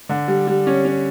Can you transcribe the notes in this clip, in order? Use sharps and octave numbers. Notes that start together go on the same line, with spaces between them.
D3
G3
G3
C#4
C#4